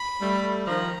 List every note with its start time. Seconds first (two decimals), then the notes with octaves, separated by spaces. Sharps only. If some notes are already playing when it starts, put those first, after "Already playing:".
Already playing: B5
0.22 G3 A3
0.67 D#3 F3 A#5